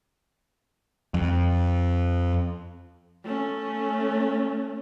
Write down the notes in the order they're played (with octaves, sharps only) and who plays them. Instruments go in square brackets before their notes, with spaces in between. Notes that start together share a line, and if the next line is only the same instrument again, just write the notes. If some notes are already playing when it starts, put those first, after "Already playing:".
[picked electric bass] F2
[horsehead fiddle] A3 C#4